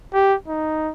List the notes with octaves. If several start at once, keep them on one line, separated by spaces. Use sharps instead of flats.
G4
D#4